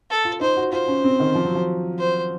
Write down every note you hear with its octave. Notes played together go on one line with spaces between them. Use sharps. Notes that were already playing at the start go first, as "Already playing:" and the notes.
A4
F4
D#4 C5
F#4
F4 C5
C#4
C4
D#3
F3
F#3
F3
C5